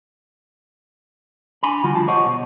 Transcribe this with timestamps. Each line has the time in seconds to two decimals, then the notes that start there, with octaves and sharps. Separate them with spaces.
1.63 D4 G#5 B5
1.84 D3 G3 F4 F#4
1.95 D2 F3 F4 A5
2.07 G4 C5 C#5 D#5 F#5
2.26 B2